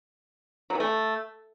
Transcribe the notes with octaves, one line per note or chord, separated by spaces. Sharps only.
F#3
E3
A3